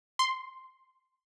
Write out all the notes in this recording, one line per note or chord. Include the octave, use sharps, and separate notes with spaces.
C6